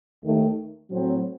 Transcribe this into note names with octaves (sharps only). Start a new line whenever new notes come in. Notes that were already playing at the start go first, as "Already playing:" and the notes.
D#2 D#3 A3
A2 F#3 C4